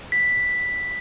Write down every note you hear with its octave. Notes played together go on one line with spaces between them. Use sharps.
B6